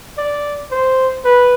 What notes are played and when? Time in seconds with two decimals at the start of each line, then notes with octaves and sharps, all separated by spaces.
0.18 D5
0.71 C5
1.25 B4